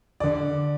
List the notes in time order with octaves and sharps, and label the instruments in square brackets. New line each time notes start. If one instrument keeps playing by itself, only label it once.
[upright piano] D3 D5